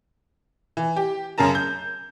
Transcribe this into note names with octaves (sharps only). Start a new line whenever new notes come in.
E3
G4
F#2 C#3 A#4 A5 A#5
G6